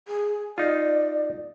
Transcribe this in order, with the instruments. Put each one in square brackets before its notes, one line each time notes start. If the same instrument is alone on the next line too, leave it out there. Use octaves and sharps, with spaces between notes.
[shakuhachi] G#4
[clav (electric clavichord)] D#4 F4 [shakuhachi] D5